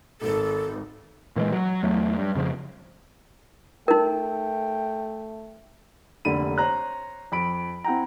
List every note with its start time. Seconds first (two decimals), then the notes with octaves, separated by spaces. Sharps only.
0.21 G#1 A4
1.36 A#2 E3 G3 G#3
1.52 F#3
1.83 E2 F#3 A3
2.18 G2
2.35 F2 C#3 F3
3.88 A3 D#4 A#4 G5
6.25 F1 D3 A#3 B5 D#7
6.58 C5 C#5 A#5 F#6
7.32 F2 B5 D7
7.84 C4 E4 F#5 G5 A#5